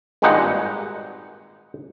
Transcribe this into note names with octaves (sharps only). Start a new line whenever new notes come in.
G#1 G2 A#2 G#3 D#4 F#5